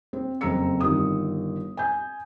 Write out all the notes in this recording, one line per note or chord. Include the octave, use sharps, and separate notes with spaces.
C4
F#1 F2 C4 A#5 E6 C#7
G1 D#3 D#6
G#5 G6